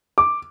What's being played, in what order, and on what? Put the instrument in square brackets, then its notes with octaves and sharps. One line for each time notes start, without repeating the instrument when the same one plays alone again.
[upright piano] D6